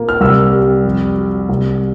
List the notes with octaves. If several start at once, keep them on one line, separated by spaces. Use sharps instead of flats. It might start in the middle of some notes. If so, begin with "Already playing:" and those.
Already playing: A#2 A#3
F6
C2 E6
G3
F2
F#3
C2